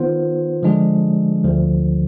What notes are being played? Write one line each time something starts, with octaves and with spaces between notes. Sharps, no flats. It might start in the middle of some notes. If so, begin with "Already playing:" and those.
Already playing: D#3 B3 F4 C5
D3 F3 G#3 D4 G#4
D2 D3 F3